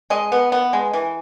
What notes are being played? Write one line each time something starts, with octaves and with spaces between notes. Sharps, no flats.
G#3 D#5
B3
B3
G#3
E3